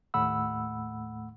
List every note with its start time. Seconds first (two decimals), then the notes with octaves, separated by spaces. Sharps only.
0.14 D#2 A2 A3 F#5 B5 E6